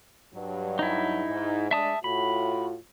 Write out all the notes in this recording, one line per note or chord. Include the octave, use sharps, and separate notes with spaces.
G2 F#3
D#4 E4
G#2
G#3 D4 E5 A5 D#6
A2 F4 F#4 B5